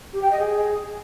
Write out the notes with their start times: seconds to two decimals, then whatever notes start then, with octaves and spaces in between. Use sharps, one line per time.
0.13 G4
0.22 G5
0.30 D#5
0.39 G#4